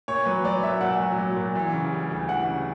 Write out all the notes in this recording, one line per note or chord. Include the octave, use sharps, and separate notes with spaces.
A#2 C#5
F#3 B4
F#3 D5
A#2 E5
A#2 F#5
F#3
F#3
A#2
E3
C#3
G3
D2
E3 F#5
C#3